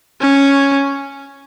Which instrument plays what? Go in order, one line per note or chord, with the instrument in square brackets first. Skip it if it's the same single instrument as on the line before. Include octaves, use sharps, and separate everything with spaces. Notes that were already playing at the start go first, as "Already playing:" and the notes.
[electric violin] C#4